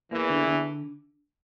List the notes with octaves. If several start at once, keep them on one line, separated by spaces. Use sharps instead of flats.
E2 E3 A#3
D3
D3